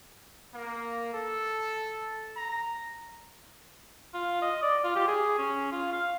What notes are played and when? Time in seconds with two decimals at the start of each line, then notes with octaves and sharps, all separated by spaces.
0.53 A#3
1.13 A4
2.36 A#5
4.14 F4
4.42 D#5
4.62 D5
4.84 F4
4.96 G4
5.08 G#4
5.39 C#4
5.72 F4
5.93 F5